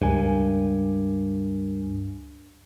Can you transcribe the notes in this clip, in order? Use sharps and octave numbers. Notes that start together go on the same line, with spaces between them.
C#2 G2 A#4 G#5